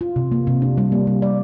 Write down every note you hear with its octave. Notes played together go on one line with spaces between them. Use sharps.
F4
C3
A#3
C3
D4
G3
A#3
G3
D5